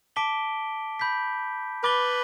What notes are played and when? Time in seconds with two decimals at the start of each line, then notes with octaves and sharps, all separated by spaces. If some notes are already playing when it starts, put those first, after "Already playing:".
0.16 A5 D6 B6 D7 G7
0.99 B5 G6 B6
1.83 B4 B5 D6 A6 G7